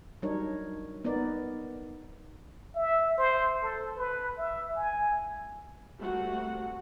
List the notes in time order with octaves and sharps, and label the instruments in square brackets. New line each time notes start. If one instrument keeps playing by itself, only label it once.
[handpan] F#3 G3 D4 D#4 A#4 C#5
B3 D#4 A#4 D5
[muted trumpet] E5
C5
A4
B4
E5
G#5
[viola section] G3 A3 A#3 C4 F#4 F#5